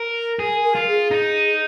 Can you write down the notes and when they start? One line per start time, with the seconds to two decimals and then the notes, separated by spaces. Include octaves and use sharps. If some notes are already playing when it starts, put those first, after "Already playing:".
Already playing: A#4
0.39 G#4 A#4
0.64 A#4
0.75 F4
0.88 G#4
1.11 D#4